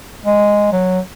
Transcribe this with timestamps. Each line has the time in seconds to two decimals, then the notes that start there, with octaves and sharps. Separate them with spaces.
0.26 G#3
0.72 F#3